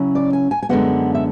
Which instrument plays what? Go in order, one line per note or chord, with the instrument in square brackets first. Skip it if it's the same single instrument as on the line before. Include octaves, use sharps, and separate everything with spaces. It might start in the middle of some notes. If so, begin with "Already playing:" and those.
Already playing: [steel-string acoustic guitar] C#3 F#3 C#4 E4
D5
G#5
G#5
G#5
F#2 D3 G#3 B3 F#5
E5